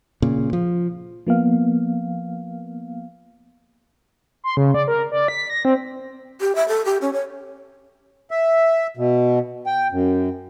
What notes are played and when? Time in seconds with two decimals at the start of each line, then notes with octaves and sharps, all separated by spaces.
0.22 A#2 C#3
0.53 F3
1.27 F3 A#3 B3 F5
4.44 C6
4.57 C#3
4.74 D5
4.88 A#4
5.12 D5
5.28 B6
5.50 A#6
5.65 C4
6.41 G4
6.55 E5
6.68 A4
6.85 G4
7.01 C#4
7.13 C#5
8.31 E5
8.97 B2
9.66 G5
9.92 F#2